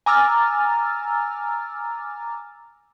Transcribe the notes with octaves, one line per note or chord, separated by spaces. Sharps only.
G#5 A#5 D6 E6 F6 A6